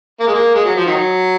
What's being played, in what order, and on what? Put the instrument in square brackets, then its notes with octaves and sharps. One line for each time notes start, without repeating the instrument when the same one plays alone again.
[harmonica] A#3
G#3
A#3
G#3
F#3
F3
D#3 F#3